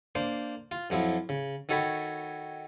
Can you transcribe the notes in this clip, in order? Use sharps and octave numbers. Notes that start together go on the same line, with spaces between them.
A#3 D4 C5
F4
F2 F3 F#3 E4
C#3
D#3 F#4 A4 C#5 B5